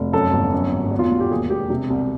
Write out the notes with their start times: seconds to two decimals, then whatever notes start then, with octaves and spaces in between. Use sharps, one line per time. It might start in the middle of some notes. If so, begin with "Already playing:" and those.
Already playing: F1
0.13 F#2 A4
0.33 G1
0.52 F#2
0.72 G#1
0.91 E2
0.99 F4
1.10 E1 F#4
1.20 G4
1.31 D#2 G#4
1.50 E1 G4
1.70 C3
1.90 C2